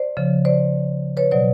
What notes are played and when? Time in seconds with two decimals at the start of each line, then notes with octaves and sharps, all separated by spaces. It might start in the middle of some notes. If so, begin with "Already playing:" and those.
Already playing: C5 D5
0.17 C#3 F3
0.45 C5 D5
1.17 B4 C#5
1.31 B2 F#3 C5 D5